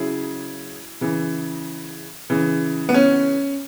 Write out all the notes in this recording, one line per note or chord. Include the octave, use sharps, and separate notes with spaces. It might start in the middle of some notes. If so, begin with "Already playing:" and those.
Already playing: C#3 F#3 E4 G#4
C#3 E3
C#3 E3
B3
C#4